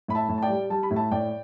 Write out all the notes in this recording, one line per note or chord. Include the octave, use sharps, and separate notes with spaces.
A2 B5
E5 A5
A2
A5
D5 G5
G3
G3 A5
B5
A2
E5 A5
A2 D5 G5